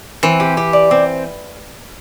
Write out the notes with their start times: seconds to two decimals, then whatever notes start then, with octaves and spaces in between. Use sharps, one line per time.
0.23 E3 C4
0.40 G4
0.57 G4
0.73 D5
0.91 C4